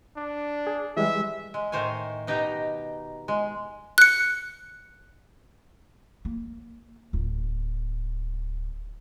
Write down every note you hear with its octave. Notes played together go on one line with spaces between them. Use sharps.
D4
G#4
E3 G3 G#3 E5
G#3
A2 D#3 C5 C#5 G#5
B2 D#4 G4 D#5 G5 A#5
G#3
F#6 C#7
A#3
D1